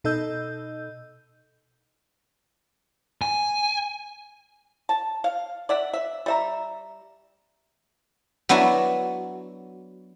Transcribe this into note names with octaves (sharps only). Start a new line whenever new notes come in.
B2 D#4 A4 D#5 E6 G6
G#5
A5
F5
D5 E5 F#5
E5
G3 E5 A#5
F#3 B3 D4 E4 F#4